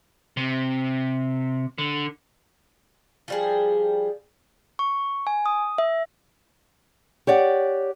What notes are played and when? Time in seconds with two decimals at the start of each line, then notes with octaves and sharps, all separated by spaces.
0.37 C3
1.78 D3
3.28 F3 G3 G#4
4.79 C#6
5.27 G#5
5.46 D#6
5.78 E5
7.27 G4 C#5 D5 F#5